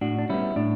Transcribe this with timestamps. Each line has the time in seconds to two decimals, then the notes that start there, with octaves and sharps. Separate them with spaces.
0.01 A2 D4 F#4
0.19 D4
0.29 G3 B3 C#4 E4
0.56 A2 D4